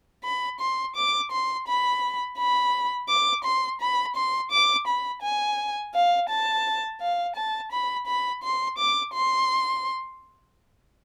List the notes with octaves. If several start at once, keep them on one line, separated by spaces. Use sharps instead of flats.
B5
C6
D6
C6
B5
B5
D6
C6
B5
C6
D6
B5
G#5
F5
A5
F5
A5
B5
B5
C6
D6
C6